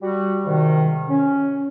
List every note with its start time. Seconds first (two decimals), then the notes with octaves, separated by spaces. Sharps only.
0.02 G3 F#4
0.46 G#2 C3 D#3
1.08 C#4